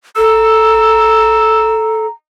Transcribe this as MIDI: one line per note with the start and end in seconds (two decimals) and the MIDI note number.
0.16 2.06 69
0.16 2.08 82
0.16 1.92 88